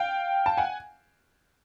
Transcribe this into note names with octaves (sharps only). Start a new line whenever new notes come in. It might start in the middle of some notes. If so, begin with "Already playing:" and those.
Already playing: F5 G5
A5
F#5 G#5